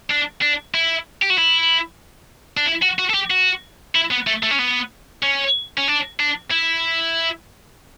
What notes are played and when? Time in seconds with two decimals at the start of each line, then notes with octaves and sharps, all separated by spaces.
0.10 D4
0.42 D4
0.74 E4
1.22 G4
1.30 F#4
1.38 E4
2.57 D4
2.66 E4
2.82 F#4
2.99 F#4
3.10 A4
3.14 G4
3.31 F#4
3.95 E4
4.11 B3
4.27 A3
4.43 A3
4.51 C#4
4.59 B3
5.23 C#4
5.78 C#4
5.88 D4
6.20 D4
6.51 E4